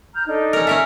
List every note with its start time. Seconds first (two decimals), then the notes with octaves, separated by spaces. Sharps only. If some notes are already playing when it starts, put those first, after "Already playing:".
0.14 A#5 F6 G6
0.26 D4 D#4 A4
0.53 C#4 A#4
0.67 C#4 A#4 E5